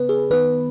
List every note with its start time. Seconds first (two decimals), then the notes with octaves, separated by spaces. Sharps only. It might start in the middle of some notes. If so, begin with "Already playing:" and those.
Already playing: C#3 B3 B4
0.09 G#4
0.30 D#3 B3 B4